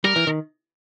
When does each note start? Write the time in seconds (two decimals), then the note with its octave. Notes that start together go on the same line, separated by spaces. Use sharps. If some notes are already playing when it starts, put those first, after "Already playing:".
0.04 G3 A#4
0.16 E3
0.27 D#3